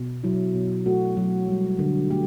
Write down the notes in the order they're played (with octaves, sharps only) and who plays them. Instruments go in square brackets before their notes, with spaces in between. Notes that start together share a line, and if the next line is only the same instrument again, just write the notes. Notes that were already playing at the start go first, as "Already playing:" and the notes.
Already playing: [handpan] B2
F#3 E4
B2
A3 F#4
F#3
G3
D3
A3 G4